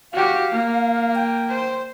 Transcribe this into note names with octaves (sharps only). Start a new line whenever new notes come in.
F#4 G4 F5
A#3
G5
C5